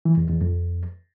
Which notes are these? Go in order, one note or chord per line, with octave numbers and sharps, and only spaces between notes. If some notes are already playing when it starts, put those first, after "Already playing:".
E3
E2
E2
F2